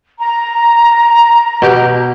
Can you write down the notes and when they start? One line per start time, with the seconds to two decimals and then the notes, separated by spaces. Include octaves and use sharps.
0.20 A#5
1.62 B2 G4